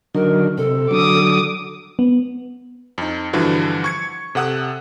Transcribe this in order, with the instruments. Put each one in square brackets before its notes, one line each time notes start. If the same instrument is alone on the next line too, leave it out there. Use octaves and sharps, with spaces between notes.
[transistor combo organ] D3 F#3 D#4 [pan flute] A#4
[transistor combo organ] C3 [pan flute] A4
[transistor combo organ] D3 F#3 [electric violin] D6 D#6
[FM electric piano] B3
[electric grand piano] F2 D#4
G2 D3 E3 F3 F#4
C#6 G#6 C#7
C3 A4 F#5 D#6 F#6